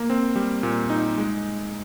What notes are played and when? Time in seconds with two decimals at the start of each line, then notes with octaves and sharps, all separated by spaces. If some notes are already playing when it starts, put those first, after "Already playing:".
Already playing: A#3
0.10 C4
0.36 G3
0.63 A#2
0.90 D#4
1.18 G#3